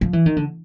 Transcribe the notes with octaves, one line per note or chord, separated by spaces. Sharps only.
F3
E3
D#3
D3